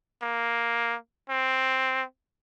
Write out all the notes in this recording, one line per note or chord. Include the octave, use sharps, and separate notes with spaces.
A#3
C4